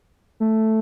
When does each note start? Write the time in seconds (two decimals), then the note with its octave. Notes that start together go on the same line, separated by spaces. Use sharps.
0.40 A3